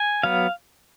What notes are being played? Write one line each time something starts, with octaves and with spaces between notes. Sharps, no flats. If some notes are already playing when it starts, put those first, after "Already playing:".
Already playing: G#5
F#3 B3 F5